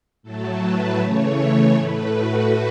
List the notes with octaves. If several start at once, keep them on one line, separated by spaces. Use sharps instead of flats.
A2 F#3 A3 A4
B4
C#3 E3 A3 C#5
C#5
A2 A3 B4
F#4